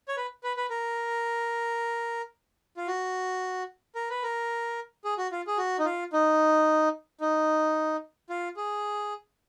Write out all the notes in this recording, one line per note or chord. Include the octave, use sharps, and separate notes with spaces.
C#5
B4
B4
B4
A#4
F4
F#4
A#4
B4
A#4
G#4
F#4
F4
G#4
F#4
D#4
F4
D#4
D#4
F4
G#4